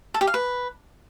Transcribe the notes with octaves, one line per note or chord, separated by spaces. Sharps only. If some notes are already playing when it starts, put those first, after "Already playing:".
A4
G4
F5
B4